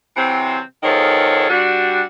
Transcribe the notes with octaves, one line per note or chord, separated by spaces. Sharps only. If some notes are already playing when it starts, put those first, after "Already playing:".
C3 E3 F#3 C4
E2 D#3 F3 G#4 A4 C#5
G3 D4 F#4